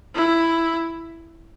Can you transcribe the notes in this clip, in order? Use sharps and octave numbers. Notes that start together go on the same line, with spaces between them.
E4